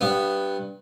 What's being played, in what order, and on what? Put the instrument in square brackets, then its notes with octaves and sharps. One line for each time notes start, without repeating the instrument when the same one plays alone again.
[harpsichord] G2 B3